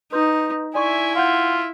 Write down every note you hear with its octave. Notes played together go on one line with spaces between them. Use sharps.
D#4 B4 C6 G6
E4 D5 E5 G#5 C6 C#6
F4 F5 F#5 G6